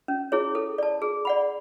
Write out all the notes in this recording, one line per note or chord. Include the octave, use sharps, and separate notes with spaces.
C#4
E4 G#4 C#5
A4
D5 A5
G#4
D5 F#5 B5